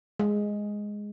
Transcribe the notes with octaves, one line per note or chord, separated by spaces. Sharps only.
G#3